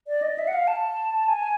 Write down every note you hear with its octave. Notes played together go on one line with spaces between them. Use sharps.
D5
D#5
E5
F#5
F5
A5
G#5